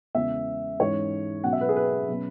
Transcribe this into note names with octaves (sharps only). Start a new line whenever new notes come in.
E2 C#3 G#3 B3 E5
G#2 E3 G#3 C#4 C#5
B2 F#3 C#4 F#5
E5
B4
G#4
B4
B2 F#3 C#4